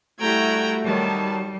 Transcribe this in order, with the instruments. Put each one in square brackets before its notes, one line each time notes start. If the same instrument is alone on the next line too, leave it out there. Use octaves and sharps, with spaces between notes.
[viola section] G3 E4 F#4 [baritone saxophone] A3 [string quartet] G5 A#5 G#6
[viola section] D#3 F#3 A5 [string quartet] G3